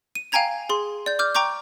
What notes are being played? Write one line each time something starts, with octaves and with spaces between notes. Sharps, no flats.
D#7
F5 G5 G#5 A#5 G#6 F7
G#4 C6
D5 G6
D6 F6 G6
G5 A#5 C#6 D6 G6